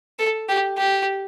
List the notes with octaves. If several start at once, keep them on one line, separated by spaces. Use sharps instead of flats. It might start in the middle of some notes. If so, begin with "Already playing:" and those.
A4
G4
G4